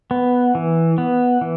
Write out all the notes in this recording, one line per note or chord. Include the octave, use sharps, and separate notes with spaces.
B3
E3
B3
E3